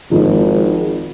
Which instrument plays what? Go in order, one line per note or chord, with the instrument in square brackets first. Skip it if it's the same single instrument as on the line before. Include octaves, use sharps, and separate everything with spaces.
[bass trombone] G#1 [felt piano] F2 G#2 F3